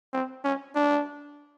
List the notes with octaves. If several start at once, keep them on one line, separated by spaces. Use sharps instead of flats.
C4
C#4
D4